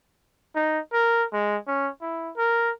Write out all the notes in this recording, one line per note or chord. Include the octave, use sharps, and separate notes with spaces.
D#4
A#4
G#3
C#4
E4
A#4